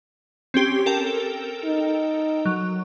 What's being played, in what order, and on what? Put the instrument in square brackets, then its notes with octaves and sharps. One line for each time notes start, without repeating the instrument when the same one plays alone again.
[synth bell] C4 C#4 G4
A4 A#4 G5
[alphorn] D#4
[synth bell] F#3